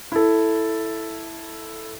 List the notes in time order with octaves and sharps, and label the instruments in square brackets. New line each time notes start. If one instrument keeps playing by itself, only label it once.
[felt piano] E4 A4